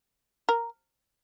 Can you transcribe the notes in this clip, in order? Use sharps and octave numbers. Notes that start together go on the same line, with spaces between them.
A#4